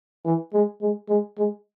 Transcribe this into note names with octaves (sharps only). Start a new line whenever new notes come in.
E3
G#3
G#3
G#3
G#3